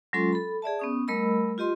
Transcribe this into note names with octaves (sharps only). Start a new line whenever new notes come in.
F#3 G#3 C#4 F4 A4 C6
A4 B5
G#4 D5 E5 A5
B3 C#4 D#6
G3 A3 A#4 D#5 B5 E6
F4 G4 D#5 C6